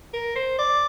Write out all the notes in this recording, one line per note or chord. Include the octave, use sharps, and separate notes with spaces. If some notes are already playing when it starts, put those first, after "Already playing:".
A#4
C5
D5